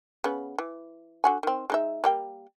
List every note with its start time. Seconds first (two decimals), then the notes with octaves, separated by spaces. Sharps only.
0.24 C#3 B3
0.58 E3
1.24 D3 F#4 G#5
1.43 D#3 C4
1.70 G#3 D#4 E5
2.04 G3 A#3 G5